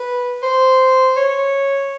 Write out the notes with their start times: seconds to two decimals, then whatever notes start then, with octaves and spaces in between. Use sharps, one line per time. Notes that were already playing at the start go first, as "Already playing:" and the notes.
Already playing: B4
0.43 C5
1.17 C#5